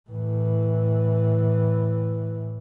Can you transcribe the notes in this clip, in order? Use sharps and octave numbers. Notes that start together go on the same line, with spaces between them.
A2 E3